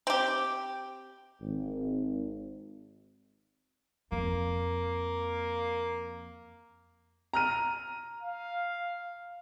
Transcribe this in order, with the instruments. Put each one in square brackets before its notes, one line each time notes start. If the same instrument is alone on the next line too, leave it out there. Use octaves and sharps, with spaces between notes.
[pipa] C4 G4
[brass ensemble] G#1
[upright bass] F2 [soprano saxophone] A#3
[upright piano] A#5 F6 D#7
[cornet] F5